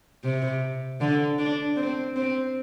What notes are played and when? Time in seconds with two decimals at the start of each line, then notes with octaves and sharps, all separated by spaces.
0.24 C3
1.01 D3
1.39 D4
1.76 C4
2.16 C4